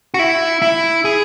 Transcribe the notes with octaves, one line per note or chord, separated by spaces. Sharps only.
F#4
E4
E4
G#4